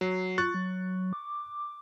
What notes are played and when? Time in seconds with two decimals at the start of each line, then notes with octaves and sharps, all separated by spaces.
0.01 F#3 C7
0.38 F4 C#6 F#6 A6
0.54 F#3
1.13 D6